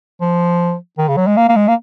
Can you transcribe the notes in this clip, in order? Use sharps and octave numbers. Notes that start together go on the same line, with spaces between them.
F3
D#3
C#3
F#3
G#3
A#3
A#3
G#3
A#3